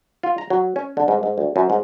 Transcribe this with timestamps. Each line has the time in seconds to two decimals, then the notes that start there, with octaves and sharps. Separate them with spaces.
0.23 F4
0.38 A#5
0.50 F#3
0.76 C#4
0.97 D3
1.08 G#2
1.23 G#2
1.38 D2
1.56 F#2
1.70 G#2